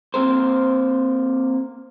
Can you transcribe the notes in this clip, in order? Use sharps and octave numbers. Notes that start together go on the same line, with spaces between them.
A#3 C4 A#4 C5